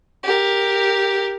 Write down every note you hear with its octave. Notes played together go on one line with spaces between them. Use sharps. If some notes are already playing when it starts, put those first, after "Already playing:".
G4 A#4